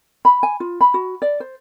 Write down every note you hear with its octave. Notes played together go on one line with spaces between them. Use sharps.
B5
G#5
F4
B5
F#4
D5
C5